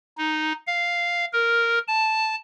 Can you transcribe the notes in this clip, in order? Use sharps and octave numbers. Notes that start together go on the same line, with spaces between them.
D#4
F5
A#4
A5